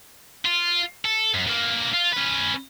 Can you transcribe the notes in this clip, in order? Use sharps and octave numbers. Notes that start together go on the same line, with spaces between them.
F4
A4
F#2
G2 A#3
F4
C#4 B4